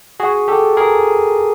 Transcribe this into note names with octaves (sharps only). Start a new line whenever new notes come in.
F#4 G#4
G4 A4
G#4 A#4